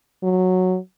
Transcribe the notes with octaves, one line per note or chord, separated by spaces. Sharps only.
F#3